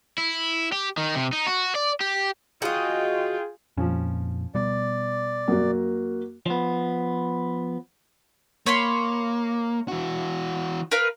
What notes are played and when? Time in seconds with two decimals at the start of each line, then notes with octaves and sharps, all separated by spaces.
0.18 E4
0.72 G4
0.98 D#3
1.15 C3
1.33 D#4
1.47 F#4
1.75 D5
2.01 G4
2.62 F4 F#4 G#4 D#5 G5
3.77 F2 A#2 F3 C#4
4.55 B2 G3 B3 D5
5.48 F#2 A#3 F#4
6.46 F3 B3
8.66 A#3 C#5 B5 C6
9.88 E3 F#4
10.91 A#4 B4 F5